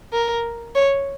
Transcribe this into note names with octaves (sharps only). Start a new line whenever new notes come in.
A#4
C#5